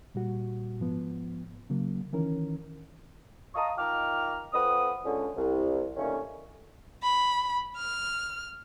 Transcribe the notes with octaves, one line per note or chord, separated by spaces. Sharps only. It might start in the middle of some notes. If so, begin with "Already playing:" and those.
A#2 G3 F#4
G#2 F3 B3
C#3 F#3 A#3
D#3 E3 C#4 A#4
D#5 F5 A5 A#5 C#6 D#6
D#3 F4 G5 A#5 D6 F6
F2 C4 B4 F#5 D#6
C#2 D3 C#4
C2
A#2 D3 D#3 A3 A#3 C#4
B5
F6